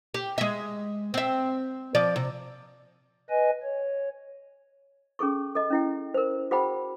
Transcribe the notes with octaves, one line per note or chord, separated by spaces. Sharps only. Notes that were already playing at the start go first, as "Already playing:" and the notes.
G4
G#3 E5
C4 E5
F3 D5
C3
B4 D#5 G#5
C#5
C#4 G#4 A4 C#6
A4 D#5
C#4 E4 G5
A#4 C5
F#4 G#4 C5 F#5 G5 B5